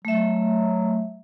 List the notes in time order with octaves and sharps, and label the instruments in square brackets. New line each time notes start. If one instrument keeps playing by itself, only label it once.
[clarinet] F#3 [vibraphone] A3 E5